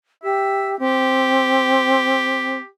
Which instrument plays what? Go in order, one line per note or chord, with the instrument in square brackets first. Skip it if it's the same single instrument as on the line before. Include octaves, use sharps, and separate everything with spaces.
[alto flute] G4 [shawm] E5
[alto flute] C4 [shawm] G4